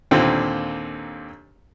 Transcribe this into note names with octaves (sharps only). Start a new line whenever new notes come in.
D#2 A#2 D3 C4